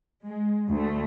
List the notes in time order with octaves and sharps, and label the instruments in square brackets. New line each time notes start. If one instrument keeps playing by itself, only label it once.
[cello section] G#3
D2 A3